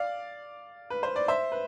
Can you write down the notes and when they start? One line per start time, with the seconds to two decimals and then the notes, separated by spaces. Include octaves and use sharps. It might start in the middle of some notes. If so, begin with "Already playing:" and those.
Already playing: D5 F5
0.90 B4
1.03 C5
1.16 D5
1.28 C5 E5
1.52 B4